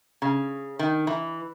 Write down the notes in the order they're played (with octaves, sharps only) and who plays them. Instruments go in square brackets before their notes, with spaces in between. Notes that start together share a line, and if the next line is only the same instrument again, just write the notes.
[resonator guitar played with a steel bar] C#3
D#3
E3